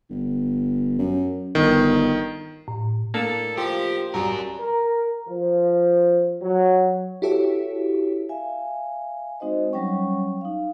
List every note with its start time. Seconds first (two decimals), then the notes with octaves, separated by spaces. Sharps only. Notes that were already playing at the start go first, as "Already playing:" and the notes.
0.10 G1
0.99 F#2
1.55 G1 D#3
2.68 A2
3.14 A2 A#3 D4 A4
3.57 F3 G4
4.14 C2 G2 F#3 G3 F#4 A#4
4.59 A#4
5.28 F3
6.42 F#3
7.22 E4 F#4 G4 A4 C#5 E5
8.29 E5 F5 G#5
9.40 G#3 C4 D#4 F#4 C5 D#5
9.73 F#3 G3 C#4 C#5 G5 C#6
10.41 D#4 F5